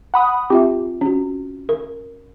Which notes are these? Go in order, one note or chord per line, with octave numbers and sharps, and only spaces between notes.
F#5 B5 D#6
C4 F4 G4 E5
C#4 F#4
A#4